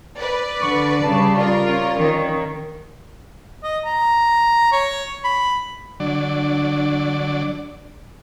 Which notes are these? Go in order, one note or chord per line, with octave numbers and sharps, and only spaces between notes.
B4 D5
D3 C#6
C#3 G3 A5
F4 A#4 D5
C#4
D#3 C#4
D#5
A#5
C#5
B5
D3 F#3 D4 D5